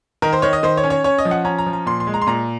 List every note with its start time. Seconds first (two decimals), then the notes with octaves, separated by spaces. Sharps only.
0.22 D#3 A#4
0.33 C5
0.42 D#3 C#5
0.53 D#5
0.63 D#3 C5
0.77 C#5
0.84 C#4
0.90 C#5
1.04 C#4 C#5
1.18 D#5
1.25 F3
1.31 F#5
1.45 C#4 A#5
1.58 A#5
1.66 F3
1.73 A#5
1.86 A#2 C6
2.00 C6
2.07 G#3
2.14 A#5
2.22 C6
2.27 A#2 A#5